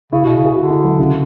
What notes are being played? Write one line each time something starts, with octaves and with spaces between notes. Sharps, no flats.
C#3 E4
B2 F#4
C#3
G#4
D3 F#4
E4
F#3
C#3